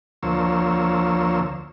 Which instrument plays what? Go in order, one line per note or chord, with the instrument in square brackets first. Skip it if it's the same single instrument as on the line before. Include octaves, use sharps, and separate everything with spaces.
[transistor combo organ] D2 F3 A#3 C5 C#5 E6